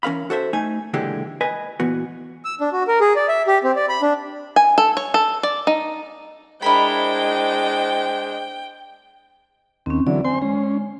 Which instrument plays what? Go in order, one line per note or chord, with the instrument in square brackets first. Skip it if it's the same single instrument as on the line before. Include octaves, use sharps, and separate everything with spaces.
[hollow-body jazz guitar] E3 C#4 A#4 F5 B5
F#4 A4 C5 E5
A3 D#4 G#5
C#2 A#2 D3 E3 G#3 G4
B4 D#5 G#5
A#2 E3 B3 F#4
[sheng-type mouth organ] E6
D4
F#4
A#4
G#4
D5
E5
G4
C4
D5
B5
D4
[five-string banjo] G#5
A4
C#5
A4
D5
D#4
[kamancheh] G#3 D4 [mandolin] E4 A#4 B5 [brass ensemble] C5 D#5 [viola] G5
[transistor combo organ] D#2 [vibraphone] C4 C#4
[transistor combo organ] D3 E3 F#3 [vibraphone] D5
[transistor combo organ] C4 C6 [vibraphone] G#5
[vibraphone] G#3 [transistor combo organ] C#4